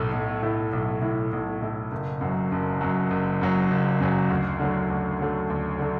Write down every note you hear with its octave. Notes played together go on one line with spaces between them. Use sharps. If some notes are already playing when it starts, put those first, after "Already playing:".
Already playing: B1 A2 A3 E4
B1
A2 A3 E4
B1
A2 A3 E4
B1
A2 A3 E4
F#1
F#2 F#3
F#1
F#2 F#3
F#1
F#2 F#3
F#1
F#2 F#3
D2
D3 F#3 A3
D2
D3 F#3 A3
D2
D3 F#3 A3